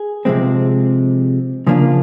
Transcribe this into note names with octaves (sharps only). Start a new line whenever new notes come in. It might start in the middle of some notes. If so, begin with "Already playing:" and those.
Already playing: G#4
C3 F3 G#3 C4
C#3 F3 A#3 D4 F4